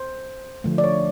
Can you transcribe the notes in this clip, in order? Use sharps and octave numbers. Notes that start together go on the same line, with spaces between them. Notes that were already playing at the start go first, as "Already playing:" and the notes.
Already playing: C5
D3 F3 A3
D5
C#5